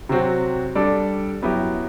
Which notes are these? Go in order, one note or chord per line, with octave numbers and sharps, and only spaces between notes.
C3 F#3 C4 F#4
G3 D4 A4 D5
F#2 F#3 B3 E4 G4